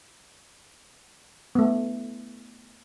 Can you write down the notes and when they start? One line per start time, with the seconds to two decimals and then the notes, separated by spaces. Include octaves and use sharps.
1.55 A3 B3